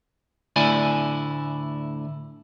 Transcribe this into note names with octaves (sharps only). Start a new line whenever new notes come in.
D2 A2 D3 E4 D5 G#5